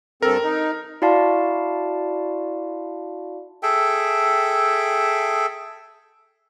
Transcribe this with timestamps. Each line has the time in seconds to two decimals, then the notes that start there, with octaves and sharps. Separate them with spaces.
0.22 G2 C4 A4 A#4
0.44 D#4
1.02 E4 F#4 D5 F5 A5 C6
3.63 G#4 A4 E5 G5